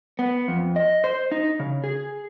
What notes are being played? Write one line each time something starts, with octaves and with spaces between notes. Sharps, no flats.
B3
F2
D#5
C5
D#4
C#3
G#4